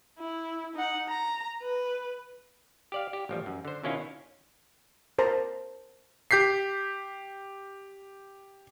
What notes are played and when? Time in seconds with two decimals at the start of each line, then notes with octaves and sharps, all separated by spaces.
0.19 E4
0.75 D#4 F#5
1.09 A#5
1.62 B4
2.92 G4 D5 F5
3.13 G4
3.29 A1 F3 G3
3.46 F#2
3.65 D3 C5
3.83 B2 D#3 C#4 E4 F4
5.19 A#4 C5 A5 A#5
6.31 G4 G6 B6 C7